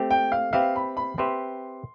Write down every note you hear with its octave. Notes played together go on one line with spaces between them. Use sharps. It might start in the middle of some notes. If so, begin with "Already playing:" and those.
Already playing: A3 C4 G4
G5
F5
C4 G4 B4 E5 F5
B5
B5
C4 G4 B4 E5 C6